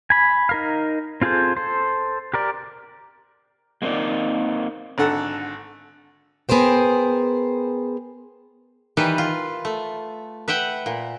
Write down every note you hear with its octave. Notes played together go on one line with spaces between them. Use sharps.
G#5 B5
D#4 A#4 F5
C4 F4 G#4 A4 C5
A4 C5
G4 A#4 D5
G#3 A#3 C4 D#4 A#4 D5
G#1 D3 A4 F#5 A5
B3 G#4 A#4 C5 G5
D#3 E3 G3 B4
F4
A3
B4 E5 F#5 G5
A#2